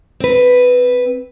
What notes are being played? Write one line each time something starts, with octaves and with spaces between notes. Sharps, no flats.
C4 B4